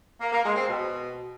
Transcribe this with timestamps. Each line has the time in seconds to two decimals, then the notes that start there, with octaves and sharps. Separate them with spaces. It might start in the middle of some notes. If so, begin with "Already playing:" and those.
0.20 A#3
0.32 A#3
0.44 G#3
0.56 C4
0.68 B2